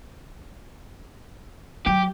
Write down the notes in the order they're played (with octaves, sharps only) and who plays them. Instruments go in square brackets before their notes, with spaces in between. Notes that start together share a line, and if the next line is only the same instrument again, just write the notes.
[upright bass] F#3 [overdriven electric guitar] G4